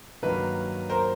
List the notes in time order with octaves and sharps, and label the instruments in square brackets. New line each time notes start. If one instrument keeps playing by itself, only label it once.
[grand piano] G2 D#3 F#3 A#3 B4
A#4 C5